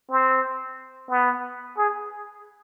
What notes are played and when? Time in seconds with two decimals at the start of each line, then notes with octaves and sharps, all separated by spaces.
0.11 C4
1.10 B3
1.78 G#4